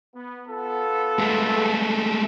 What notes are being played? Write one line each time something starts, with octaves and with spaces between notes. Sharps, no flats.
B3
B3 F4 A4
G#3 A3